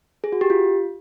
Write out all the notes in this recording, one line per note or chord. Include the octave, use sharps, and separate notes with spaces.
G#4
F#4
G4
F4